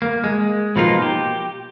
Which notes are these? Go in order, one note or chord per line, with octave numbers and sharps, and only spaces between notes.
A#3
G#3
B2 F3 A#3 D#4 F4
G4